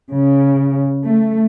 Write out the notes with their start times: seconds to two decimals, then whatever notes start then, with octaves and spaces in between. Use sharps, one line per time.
0.12 C#3
1.05 A3